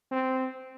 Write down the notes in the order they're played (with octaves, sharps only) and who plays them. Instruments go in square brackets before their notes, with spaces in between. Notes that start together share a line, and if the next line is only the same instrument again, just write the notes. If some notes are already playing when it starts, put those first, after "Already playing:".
[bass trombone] C4